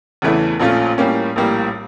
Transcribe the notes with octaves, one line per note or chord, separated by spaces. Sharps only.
E2 C#3 E3 A3 E4
A#1 A#2 A3 C#4 F4
A2 G3 A#3 C#4
A#1 A2 G3 A#3